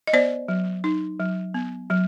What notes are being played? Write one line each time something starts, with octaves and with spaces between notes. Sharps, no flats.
D#5
B3 C5 D5
F#3
D#4
F#3
B3
F#3